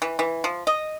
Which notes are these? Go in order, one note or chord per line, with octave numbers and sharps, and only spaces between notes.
E3
E3
F3
D#5